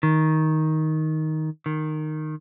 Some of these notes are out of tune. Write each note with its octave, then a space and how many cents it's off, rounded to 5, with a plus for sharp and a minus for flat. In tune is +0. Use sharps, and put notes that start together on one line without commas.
D#3 +10
D#3 -10